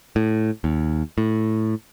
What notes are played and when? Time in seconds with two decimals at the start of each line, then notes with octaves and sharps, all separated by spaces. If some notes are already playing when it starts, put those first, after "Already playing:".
0.16 A2
0.64 D#2
1.18 A2